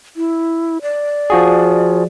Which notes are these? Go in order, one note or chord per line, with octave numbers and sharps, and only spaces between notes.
E4
D5
F3 F#4 G#4